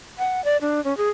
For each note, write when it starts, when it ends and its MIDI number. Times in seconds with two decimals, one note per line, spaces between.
0.19 0.43 78
0.45 0.57 74
0.61 0.82 62
0.84 0.96 61
0.97 1.09 68